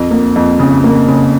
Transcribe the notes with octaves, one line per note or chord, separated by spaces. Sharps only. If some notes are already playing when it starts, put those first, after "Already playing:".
Already playing: F2
A#3
F2
C#3
A#3
C#3